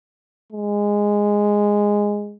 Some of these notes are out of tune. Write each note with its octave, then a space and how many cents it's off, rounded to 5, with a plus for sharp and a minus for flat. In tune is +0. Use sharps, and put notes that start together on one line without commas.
G#3 -10